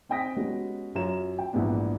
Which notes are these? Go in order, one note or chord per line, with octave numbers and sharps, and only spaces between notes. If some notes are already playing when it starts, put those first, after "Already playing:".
C4 D#4 G5 D#6 A#6 B6
G#3 B3 C#4 D#4 F#4 G4
F#2 F#3 F4 C#5 A#5 E7
G5
A#1 G#2 E3 B3 D4